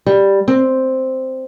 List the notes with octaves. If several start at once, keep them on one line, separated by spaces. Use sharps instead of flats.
G3
C4